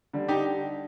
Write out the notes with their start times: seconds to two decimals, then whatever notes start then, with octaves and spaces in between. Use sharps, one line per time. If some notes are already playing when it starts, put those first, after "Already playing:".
0.14 D3 G3
0.28 D#4 G4